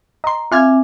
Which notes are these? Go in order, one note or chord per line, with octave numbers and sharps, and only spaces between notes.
D#5 A#5 C6
C4 F4 E5 G#5 D6 F6 G#6